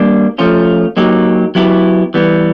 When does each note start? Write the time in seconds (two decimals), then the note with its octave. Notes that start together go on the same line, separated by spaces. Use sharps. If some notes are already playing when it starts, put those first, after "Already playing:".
Already playing: G3 A#3 D4
0.38 F3 A3 C#4 F4
0.97 F#3 A#3 D#4 G4
1.55 F#3 B3 E4 G4
2.14 E3 G3 B3